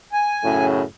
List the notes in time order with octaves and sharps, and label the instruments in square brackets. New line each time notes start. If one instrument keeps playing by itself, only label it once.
[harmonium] G#5
[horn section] F#2 A2 C#3